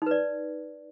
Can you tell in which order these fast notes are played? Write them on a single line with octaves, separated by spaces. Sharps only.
D#4 B4 D5